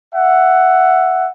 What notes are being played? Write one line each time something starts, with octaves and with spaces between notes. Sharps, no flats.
E5 F#5